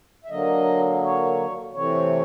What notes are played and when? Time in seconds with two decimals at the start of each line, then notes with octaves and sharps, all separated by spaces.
0.24 E5
0.30 D3 F#3 A#3 D#5
1.03 C#5
1.74 C3 E3 A3 C4 C#5